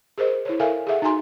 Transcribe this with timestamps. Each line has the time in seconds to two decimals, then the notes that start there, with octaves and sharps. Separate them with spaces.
0.18 G#4 A#4 C5 D#5
0.45 E4 C#5
0.60 A4 A#4 E5 F5 G#5
0.87 G#4 A4 E5 F#5
1.02 D#4 F#4 G#5 A#5 C6